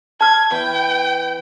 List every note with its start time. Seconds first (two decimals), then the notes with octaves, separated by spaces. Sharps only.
0.21 A5 F6 G#6
0.51 E2 E3 B4 G5